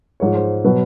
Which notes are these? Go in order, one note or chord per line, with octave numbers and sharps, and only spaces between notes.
G#2 F3 G#3 C#5
C5
B2 F#3 B4